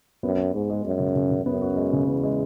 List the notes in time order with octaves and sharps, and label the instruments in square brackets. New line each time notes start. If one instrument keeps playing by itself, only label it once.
[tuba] F#2 [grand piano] B3
[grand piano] B3
[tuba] G#2 [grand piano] G#3
[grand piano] G#3
[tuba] F#2 [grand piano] G#3
[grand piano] C#3
C#3
C#3
[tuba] F#2 [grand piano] B3
[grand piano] F#4
G#3
C#3
[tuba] E2 [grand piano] B3
[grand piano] G#3